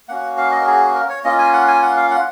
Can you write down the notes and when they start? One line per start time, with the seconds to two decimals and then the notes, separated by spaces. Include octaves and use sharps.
0.09 A#3 C#4 F#4 F#5
0.38 F5
0.51 D#5
0.61 A#4
0.66 G#4
0.95 A#4
1.09 C#5
1.24 A#3 C#4 F4 D#5
1.39 G#5
1.53 F#5
1.68 G#5
1.82 F#5
1.97 F5
2.11 F#5